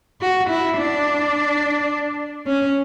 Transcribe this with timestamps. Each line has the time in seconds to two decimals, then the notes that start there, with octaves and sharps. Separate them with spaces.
0.21 F#4
0.49 E4
0.77 D4
2.47 C#4